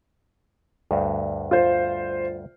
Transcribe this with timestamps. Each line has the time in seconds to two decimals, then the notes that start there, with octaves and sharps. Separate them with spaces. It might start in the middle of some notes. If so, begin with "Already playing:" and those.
0.91 D2 G2
1.51 F4 C5